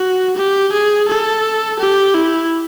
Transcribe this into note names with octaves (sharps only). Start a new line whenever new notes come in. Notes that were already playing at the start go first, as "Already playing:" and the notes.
Already playing: F#4
G4
G#4
A4
G4
E4